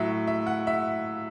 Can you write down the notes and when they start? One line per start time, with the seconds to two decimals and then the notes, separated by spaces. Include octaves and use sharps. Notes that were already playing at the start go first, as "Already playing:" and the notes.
Already playing: A2 F#3 E5
0.27 E5
0.47 F#5
0.67 E5